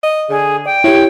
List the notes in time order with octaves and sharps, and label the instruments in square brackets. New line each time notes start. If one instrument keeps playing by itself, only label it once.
[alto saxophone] D#5
[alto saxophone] D3 [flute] G#4
[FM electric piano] D5 [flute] G5
[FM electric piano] E4 G4 [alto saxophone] C#5